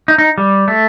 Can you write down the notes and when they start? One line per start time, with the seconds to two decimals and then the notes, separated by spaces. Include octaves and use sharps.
0.08 D#4
0.18 D#4
0.38 G3
0.68 A3